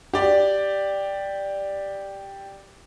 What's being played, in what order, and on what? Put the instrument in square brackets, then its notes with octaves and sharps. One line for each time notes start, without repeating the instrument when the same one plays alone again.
[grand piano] G4 D5